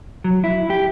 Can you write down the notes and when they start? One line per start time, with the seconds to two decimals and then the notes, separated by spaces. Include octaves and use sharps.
0.24 F#3
0.44 E4
0.70 G4